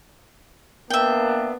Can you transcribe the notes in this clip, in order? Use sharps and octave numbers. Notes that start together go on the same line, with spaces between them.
A#3 B3 D4 E5 G5